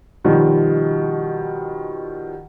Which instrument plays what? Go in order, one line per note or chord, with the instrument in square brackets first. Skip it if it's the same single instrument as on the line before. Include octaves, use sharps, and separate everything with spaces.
[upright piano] B2 D#3 F3 G3